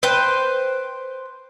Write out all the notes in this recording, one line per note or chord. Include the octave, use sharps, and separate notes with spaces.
B4 C5 G5